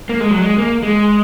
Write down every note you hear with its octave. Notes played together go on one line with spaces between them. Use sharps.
A#3
G#3
F#3
G#3
A#3
G#3